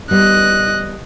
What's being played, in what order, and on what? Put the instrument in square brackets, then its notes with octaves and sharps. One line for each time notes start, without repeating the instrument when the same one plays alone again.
[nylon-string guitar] G3 B3 [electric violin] D#5 F#6